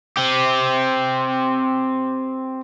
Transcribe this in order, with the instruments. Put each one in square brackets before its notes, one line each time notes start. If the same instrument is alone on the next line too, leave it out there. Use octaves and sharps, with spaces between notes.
[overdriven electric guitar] C4 G4